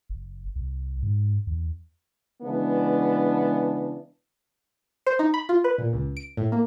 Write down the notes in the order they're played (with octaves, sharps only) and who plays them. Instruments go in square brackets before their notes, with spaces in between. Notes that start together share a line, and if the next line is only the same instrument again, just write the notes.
[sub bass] F#1
C2
G#2
E2
[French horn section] C#3 E3 G#3 B3 D4
[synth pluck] C5
D#4
B5
F4
B4
A#2
C#2
D7
A2
A#3